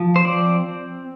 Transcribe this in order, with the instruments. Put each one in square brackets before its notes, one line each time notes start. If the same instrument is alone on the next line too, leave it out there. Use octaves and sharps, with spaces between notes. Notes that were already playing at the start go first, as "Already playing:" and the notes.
Already playing: [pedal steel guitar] F3
C5
C4 D5